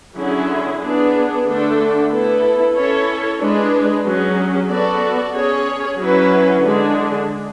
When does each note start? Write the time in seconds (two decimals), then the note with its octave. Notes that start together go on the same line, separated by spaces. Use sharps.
0.16 D3 F#3 C#4 E4 G#4
0.81 B3 D4 G#4
1.45 D3 A3 D4 A4
2.10 B3 E4 A4
2.75 C#4 E4 A4 C#5
3.39 G#3 D4 G#4 B4
4.04 F#3 C#4 G#4
4.69 B3 F#4 A4 D5
5.33 C#4 G#4 C#5
5.98 F#3 C#4 E4 B4
6.63 D3 G#3 D4 G#4